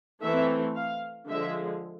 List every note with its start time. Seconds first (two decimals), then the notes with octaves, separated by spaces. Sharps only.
0.23 E3 A3 C4 E5
0.76 F5
1.30 D3 F3 G#3 E5